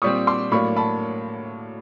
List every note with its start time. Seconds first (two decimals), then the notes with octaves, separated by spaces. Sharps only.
0.02 A#2 G3 C4 C#6 D#6
0.27 C6 D6
0.51 A2 F#3 A#3 D4 B5 C#6
0.76 A5 B5